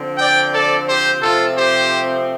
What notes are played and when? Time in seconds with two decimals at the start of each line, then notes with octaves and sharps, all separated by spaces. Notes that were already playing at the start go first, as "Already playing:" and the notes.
Already playing: D3 F3 C4
0.18 D5 G5
0.52 A4 D5
0.87 G4 C5
1.21 C3 F3 A3 C4 F4 A4
1.56 G4 C5